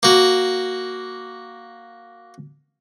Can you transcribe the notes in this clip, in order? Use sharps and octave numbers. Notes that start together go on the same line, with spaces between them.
A#3 F#4